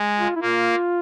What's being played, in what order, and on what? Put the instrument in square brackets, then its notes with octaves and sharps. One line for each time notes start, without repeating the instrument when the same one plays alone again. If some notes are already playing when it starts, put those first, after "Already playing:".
Already playing: [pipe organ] G#3
[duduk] F4
E4
[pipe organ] A#3 [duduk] F4